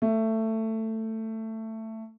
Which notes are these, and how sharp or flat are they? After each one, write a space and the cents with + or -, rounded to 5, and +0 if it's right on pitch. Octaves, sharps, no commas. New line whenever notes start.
A3 +15